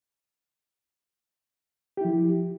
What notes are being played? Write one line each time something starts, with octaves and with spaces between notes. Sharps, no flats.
F3 E4 G4